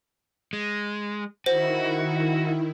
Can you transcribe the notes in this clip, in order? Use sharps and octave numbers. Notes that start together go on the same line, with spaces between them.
G#3
D#3 E4 F#4 C5